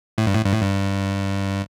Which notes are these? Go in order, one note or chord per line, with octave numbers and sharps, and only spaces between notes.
A2
G2
A2
G2
A2
G2